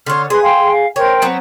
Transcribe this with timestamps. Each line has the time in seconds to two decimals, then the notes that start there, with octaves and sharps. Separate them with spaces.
0.06 D3 C#5 C6 F6
0.30 G#4 B4 C6
0.42 F5 G5 C6
0.71 F5
0.96 A#4 C5 C#5 G5
1.22 F#3 B3 C4